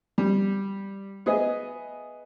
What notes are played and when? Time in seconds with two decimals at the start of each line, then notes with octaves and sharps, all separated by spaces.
0.18 G3
1.26 B3 G#4 D#5 E5